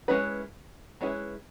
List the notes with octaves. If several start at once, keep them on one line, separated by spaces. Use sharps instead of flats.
G#3 C#4 E4 G#4 B4
G#3 C#4 E4 G#4 B4